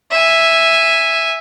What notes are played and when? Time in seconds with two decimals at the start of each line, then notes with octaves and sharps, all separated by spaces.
0.11 E5 G#5